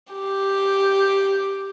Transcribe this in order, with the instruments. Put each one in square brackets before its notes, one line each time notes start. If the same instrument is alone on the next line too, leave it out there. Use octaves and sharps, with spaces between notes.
[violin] G4